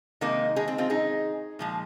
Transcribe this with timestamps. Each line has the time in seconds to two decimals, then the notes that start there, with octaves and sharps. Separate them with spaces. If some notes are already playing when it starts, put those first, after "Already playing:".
0.21 C3 D#3 G#3 A#3 D#4
0.56 D#4 G#4
0.68 C4
0.78 C4 F4
0.90 D#4 G#4
1.59 A#2 F3 G#3